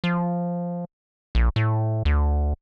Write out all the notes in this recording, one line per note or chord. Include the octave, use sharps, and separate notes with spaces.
F3
A#1
A2
D2